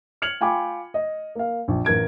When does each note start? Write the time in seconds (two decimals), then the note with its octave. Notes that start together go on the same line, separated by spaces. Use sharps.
0.22 F6 G#6 C#7 F7 F#7
0.41 F4 G5 G#5 B5 D6
0.94 D#5
1.35 A#3 F5
1.68 A#1
1.85 A1 A#4 G#6 D7